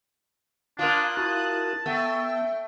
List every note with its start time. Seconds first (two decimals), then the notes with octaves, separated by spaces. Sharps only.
0.79 A#3 D4 F4 D#6 F#6
1.17 E4 F#4 A5
1.86 A3 B3 G5 E6